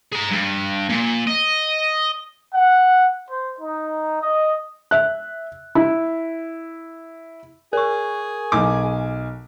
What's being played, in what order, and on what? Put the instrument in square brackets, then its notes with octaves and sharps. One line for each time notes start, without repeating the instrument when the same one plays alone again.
[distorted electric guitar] G#4 A#5
G2
A#2
D#5
[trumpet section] F#5
C5
D#4
D#5
[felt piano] E5 F#6
E4
[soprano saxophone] G#4 [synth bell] A#4 C#6
[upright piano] B1 G#5 D6